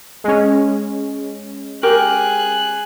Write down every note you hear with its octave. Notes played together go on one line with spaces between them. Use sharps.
G#3 C#4
G4 G#4 A#4 F#6